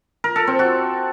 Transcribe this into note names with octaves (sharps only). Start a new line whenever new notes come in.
A#4
A4
C4
F#4